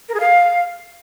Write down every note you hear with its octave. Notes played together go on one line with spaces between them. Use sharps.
A#4
G#4
F5